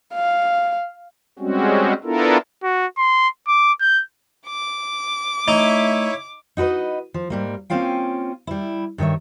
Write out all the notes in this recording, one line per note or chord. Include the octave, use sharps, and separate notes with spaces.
F5
G3 G#3 C4 C#4 F#4
B3 D4 E4 F4 A4 A#4
F#4
C6
D6
G6
D6
A3 D#4 E4 C#5 E5
D#4 F#4 A#4 B4 D#5
F3
G#2 G3 A#3
A#3 C4 C#4 F4 F5 G5
G3 E4
G2 D#3 C#5 E5